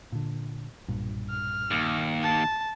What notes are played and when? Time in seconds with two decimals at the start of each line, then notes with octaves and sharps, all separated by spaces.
0.12 A#2 D3
0.88 B1 G2 A#2
1.30 F6
1.71 D#2
2.23 A5